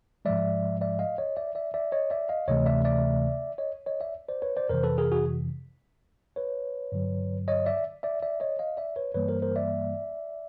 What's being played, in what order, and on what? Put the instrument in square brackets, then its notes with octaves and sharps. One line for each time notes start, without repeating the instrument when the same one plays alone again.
[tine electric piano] G#2 F3 G#3 D5 E5
D5 E5
D#5 F5
C#5 D#5
D5 E5
D5 E5
D5 E5
C#5 D#5
D5 E5
D#5 F5
D2 C3 E3 A3 C#5 D#5
D5 E5
D5 E5
C#5 D#5
C#5 D#5
D5 E5
C5 D5
B4 C#5
C5 D5
F2 C3 E3 A#4 C5
A4 B4
G#4 A#4
F#4 G#4
B4 C#5
G2 D3 F#3
C#5 D#5
D5 E5
D5 E5
D5 E5
C#5 D#5
D#5 F5
D5 E5
B4 C#5
G2 E3 G3 A#3 B4 C#5
A#4 C5
A#4 C5
D5 E5